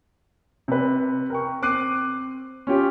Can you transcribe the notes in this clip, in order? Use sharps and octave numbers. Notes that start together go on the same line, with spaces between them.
C3 B4
A#4 G5 C#6
C4 D6 F#6 C7 D#7
C#4 F4 G4